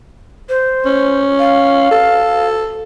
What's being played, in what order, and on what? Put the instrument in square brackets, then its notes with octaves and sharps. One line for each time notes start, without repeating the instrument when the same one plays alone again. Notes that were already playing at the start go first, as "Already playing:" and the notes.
[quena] C5
[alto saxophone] C#4
[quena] F5
[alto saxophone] A4